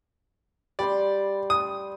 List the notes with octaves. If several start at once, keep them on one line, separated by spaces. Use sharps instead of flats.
G3 D5 G5 C6
D#6